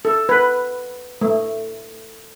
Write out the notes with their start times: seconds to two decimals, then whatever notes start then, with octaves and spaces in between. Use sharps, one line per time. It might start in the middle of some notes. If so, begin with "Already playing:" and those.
0.05 A4
0.29 B4
1.21 A3